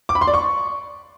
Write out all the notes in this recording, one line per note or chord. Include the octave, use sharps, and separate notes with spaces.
D6
B5
C6
D5
C#6